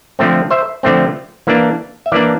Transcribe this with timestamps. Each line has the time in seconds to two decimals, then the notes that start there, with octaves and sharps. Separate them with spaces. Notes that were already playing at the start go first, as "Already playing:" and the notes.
0.19 D3 F3 A3 C4
0.50 C5 E5
0.83 D3 F3 A3 C4
1.47 E3 A#3 D4
2.06 E5
2.12 E3 A#3 D4 D5 F5